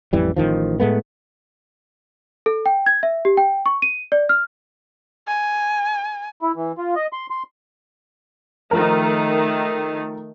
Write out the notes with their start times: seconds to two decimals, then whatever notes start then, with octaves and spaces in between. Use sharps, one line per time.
0.13 A1 F2 E3 G3
0.36 A1 C3 D#3 F3
0.80 A2 G#3 A3 B3
2.46 A4
2.66 G5
2.86 G#6
3.03 E5
3.25 G4
3.37 G5
3.66 C#6
3.82 D#7
4.12 D5
4.29 F6
5.28 G#5
6.42 E4
6.56 E3
6.78 F4
6.96 D#5
7.13 C6
7.30 C6
8.71 D#3 F3 A3 A#4